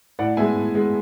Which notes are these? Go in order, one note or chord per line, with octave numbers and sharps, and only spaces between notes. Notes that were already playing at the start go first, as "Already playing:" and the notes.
A2 D5 F#5
G#3 B3 E5 G#5
A2
G#3 B3